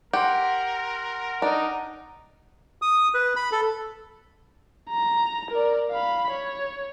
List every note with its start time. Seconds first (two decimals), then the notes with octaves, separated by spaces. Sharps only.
0.13 G4 A#4 F#5 C6
1.42 D4 D#4
2.82 D#6
3.14 B4
3.36 B5
3.52 A4
4.89 A#5
5.51 A#4 D5
5.91 F5 B5
6.30 C#5